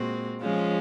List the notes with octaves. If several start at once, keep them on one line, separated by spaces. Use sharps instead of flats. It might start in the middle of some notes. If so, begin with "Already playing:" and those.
Already playing: A#2 G#3 C4 F#4
F3 G#3 C#4 F4